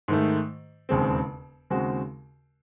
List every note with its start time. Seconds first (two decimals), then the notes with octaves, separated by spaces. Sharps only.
0.08 G#2 D#3 A3
0.89 E1 D#2 C#3 G#3 C4
1.70 D#2 C#3 G#3 C4 F#4